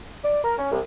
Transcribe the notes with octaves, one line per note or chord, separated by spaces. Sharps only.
D5
A#4
C#4
C2